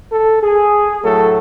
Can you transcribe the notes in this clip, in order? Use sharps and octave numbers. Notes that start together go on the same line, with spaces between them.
A4
G#4
A2 F#3 A3 A4